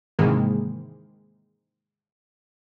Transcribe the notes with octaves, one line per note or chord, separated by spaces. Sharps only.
G#2 C3 D#3 E3 G#3 A#3